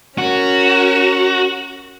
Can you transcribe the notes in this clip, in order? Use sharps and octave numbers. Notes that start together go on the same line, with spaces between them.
C#4 F#4 A#4